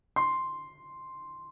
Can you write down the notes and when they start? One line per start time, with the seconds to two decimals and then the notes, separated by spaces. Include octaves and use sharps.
0.16 C6